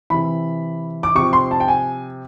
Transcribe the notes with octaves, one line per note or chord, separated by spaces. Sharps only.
C3 E3 B5
D6
C3 F3 C#6
C6
A5
G5
G#5